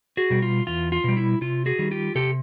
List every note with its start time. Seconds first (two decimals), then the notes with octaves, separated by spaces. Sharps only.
0.17 F#4 G#4
0.30 B2 G3
0.42 F4
0.67 E2 F4
0.92 F4
1.04 B2 G3
1.17 E4
1.41 C3 F4
1.66 F#4 G#4
1.79 D#3 G3
1.91 F4 G4
2.15 C3 G4 A4